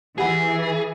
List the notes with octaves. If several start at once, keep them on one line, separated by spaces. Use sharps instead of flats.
E3 G4 G#4 F#5 B5